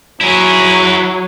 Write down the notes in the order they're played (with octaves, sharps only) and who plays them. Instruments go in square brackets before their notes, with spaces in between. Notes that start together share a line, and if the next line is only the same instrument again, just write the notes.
[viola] F#3 [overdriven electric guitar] E4 G#4